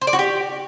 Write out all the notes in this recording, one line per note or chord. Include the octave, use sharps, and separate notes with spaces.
C5
D5
F#4
G4